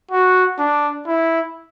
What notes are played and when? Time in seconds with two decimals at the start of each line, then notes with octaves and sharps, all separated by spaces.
0.11 F#4
0.59 D4
1.07 E4